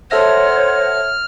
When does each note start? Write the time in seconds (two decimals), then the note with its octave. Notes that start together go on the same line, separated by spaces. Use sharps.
0.11 A4 C5 C#5 E5 F#5 F6 A#6